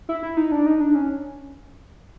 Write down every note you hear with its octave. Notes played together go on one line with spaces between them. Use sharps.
E4
E4
D#4
D4
D#4
D4
C#4